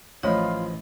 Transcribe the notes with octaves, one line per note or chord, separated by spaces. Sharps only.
A1 F3 A3 F4 C#5 D#5 B5